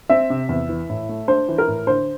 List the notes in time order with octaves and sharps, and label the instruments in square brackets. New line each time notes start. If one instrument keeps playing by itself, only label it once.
[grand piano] C4 [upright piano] E5
[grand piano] C3
E2
E3
A2
A3
[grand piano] D4 [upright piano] C5
[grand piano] E3
[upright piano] A#4
[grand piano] A2
[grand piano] D3 [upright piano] C5